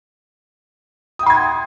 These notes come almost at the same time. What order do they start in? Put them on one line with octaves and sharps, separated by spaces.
D#6 G5 C6 G#6 F#5